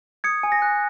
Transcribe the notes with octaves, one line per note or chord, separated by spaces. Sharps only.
D#6 G#6 C#7
G#5
A#6
F#6